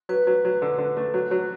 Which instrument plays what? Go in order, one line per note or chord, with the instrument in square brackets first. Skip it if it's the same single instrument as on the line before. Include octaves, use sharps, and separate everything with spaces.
[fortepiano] F#3 [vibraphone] B4
[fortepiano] F#3
F#3
D3
D3
A3
F#3
F#3